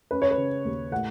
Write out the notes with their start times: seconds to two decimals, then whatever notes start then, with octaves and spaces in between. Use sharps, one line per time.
0.11 C#4 B4
0.22 C#5
0.31 B4
0.37 C#3
0.65 D#2
0.92 A2 F#5